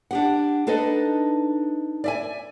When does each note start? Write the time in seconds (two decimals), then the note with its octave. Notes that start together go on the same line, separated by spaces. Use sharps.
0.11 D4 G4 F#5
0.67 D4 D#4 A4 B4 D#5
2.04 D5 E5 G#5